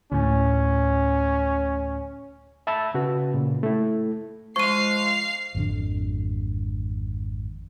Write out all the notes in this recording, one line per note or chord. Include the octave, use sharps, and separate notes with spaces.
D2 A2 C#4
E5 A5 B5 E6
C#3 F#4 B4
A#2 C#3
A3 E4
F3 G#3 F5 C#6 C7 D#7
G#1 F2 D3